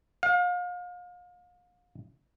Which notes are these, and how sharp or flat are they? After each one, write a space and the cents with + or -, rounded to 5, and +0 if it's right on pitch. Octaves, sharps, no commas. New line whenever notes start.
F5 +35